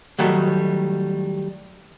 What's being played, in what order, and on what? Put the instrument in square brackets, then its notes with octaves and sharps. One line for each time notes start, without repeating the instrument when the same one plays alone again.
[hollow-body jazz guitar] D#3 F#3 G3 A3